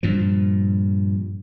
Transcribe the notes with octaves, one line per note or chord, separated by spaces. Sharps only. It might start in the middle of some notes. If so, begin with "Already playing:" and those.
G2 A#2 F3